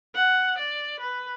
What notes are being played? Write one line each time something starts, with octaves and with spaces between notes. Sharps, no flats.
F#5
D5
B4